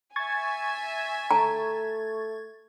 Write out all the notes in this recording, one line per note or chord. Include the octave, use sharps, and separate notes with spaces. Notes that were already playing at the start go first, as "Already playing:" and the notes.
E5 G#5 C#6 G#6 A6
A3 A5 A#5